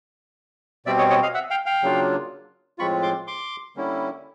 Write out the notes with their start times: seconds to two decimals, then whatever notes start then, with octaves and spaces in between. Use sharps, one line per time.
0.86 B2 G3 C4 D5 E5
0.98 C#5 D#5
1.10 C#5 D#5
1.23 D#5 F5
1.34 E5 F#5
1.51 F5 G5
1.66 F5 G5
1.83 C#3 F#3 A#3 D4 F4
2.78 A2 F3 G#3 C4 F4 B5 C#6
3.03 C6 D6
3.27 C6 D6
3.76 D3 G3 A#3 C#4 E4